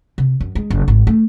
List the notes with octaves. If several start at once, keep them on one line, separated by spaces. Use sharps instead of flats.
C3
F#2
G#3
F#1
G#1
A3